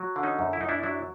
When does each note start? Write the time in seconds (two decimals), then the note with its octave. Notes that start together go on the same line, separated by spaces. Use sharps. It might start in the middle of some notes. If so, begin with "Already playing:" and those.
Already playing: F#3
0.16 D3
0.23 C#4 D#4
0.39 F#2
0.53 E4
0.61 F#2 D#4
0.69 D4 E4
0.83 F#3 D4 E4